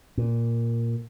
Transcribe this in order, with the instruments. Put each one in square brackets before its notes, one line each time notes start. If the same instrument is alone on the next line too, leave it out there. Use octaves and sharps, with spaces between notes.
[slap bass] A#2